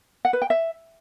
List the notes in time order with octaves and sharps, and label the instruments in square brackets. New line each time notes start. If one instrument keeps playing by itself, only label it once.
[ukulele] F#5
B4
G5
E5